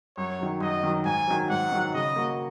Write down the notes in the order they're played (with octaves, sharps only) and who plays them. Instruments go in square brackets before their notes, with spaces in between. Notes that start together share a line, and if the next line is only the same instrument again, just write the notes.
[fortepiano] F#2 [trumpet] C#5
[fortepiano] D#3 F#3
[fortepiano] F#2 [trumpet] D#5
[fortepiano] D#3 F#3
[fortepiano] G#2 [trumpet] G#5
[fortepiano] D#3 F#3
[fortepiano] G#2 [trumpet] F#5
[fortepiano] D#3 F#3
[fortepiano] C#3 [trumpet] D#5
[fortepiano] A#3 F#4